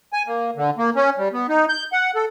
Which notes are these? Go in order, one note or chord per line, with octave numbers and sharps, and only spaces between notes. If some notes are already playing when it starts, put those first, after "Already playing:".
G#5
A#3
D3
A#3
C#4
G3
B3
D#4
G6
F#5
A4